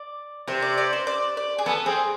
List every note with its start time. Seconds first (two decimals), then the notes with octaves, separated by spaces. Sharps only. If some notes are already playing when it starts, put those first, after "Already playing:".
Already playing: D5
0.47 C3 C5
0.62 D5
0.78 D5
0.93 C5
1.07 D5
1.37 D5
1.58 G#4
1.66 B3 A4
1.86 C4 G#4